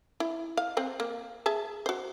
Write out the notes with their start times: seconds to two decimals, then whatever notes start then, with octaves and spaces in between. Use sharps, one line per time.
0.20 E4
0.57 F5
0.77 C4 C5 F#5
1.00 A#3
1.46 G#4 E5 A5
1.86 F#4 C5